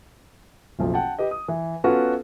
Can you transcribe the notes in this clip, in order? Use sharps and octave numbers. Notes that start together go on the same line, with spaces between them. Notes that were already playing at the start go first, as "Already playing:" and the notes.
F#1 B1 F3
F#5 G5 A5
G4 B4 D#5
D#6
E3
B3 C#4 F4 F#4 A4 B4